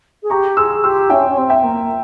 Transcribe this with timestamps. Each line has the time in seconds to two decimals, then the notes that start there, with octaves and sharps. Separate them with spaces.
0.22 G#4
0.30 G4 A#5 C#6
0.57 G#4 C6 E6
0.83 G4 C6 E6
1.09 C#4 E5 G5
1.28 C#4
1.36 C4
1.50 E5 G5
1.63 A#3